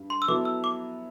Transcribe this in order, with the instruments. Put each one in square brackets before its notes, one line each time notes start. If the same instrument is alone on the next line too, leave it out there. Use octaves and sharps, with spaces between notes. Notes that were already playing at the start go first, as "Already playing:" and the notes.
Already playing: [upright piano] G2
[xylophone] C6
E6
[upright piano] F#3 B3 E4 A4 [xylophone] D6
[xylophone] E6
D6